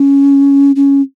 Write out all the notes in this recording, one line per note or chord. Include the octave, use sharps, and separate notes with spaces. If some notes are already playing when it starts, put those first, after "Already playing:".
Already playing: C#4
C#4